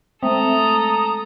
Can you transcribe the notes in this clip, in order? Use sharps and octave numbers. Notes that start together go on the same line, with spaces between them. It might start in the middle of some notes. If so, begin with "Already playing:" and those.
G#3 A3 C4 A4 E5 A#5 D#6